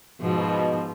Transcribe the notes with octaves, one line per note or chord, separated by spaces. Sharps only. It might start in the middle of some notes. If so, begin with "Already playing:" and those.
G#2 B2 F3